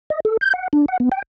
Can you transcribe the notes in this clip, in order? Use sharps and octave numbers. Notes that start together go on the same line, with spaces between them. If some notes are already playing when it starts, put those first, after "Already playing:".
D#5
A4
G6
F#5
D4
F#5
B3
G5